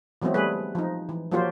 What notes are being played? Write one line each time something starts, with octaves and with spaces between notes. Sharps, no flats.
E3 F#3 G#3 B3 C4 E4
G3 A3 G#4 B4
F3 D#4
E3
F3 F#3 A#3 F4 G4 C5